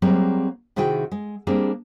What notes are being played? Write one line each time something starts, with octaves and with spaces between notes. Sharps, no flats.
F#3 G3 A#3 C4 G#4
C3 D#3 E4 F#4 G#4 G5
G#3
G3 A#3 C4 D4 G#4